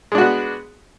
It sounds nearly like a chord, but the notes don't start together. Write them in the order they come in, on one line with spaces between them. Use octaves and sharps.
G#3 D4 F#4 B3